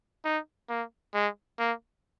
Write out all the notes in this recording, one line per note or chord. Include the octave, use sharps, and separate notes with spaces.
D#4
A#3
G#3
A#3